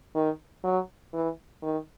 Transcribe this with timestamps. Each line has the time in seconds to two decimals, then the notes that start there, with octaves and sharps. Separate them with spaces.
0.15 D#3
0.64 F#3
1.13 E3
1.62 D#3